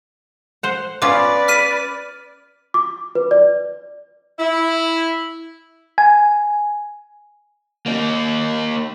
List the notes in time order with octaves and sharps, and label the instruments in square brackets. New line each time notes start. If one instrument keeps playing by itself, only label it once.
[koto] C5 F#5
[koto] B3 C#4 F4 [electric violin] B4 D5 [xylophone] D6
[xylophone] F6 B6 D#7
[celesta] D6
B4
D5
[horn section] E4
[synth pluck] G#5
[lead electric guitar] A#3 D#4